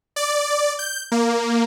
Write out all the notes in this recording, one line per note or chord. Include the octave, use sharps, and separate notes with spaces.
D5
G6
A#3